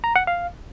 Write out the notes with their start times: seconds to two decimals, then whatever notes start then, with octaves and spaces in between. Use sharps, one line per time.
0.04 A#5
0.16 F#5
0.27 F5